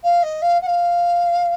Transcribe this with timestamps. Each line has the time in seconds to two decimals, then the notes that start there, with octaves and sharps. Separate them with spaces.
0.03 F5
0.22 D#5
0.42 F5
0.61 F#5
0.66 F5